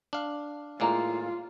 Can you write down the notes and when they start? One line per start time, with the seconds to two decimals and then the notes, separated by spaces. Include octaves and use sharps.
0.13 D4 F5
0.80 A2 G#3 A#3 F4 D5 A#5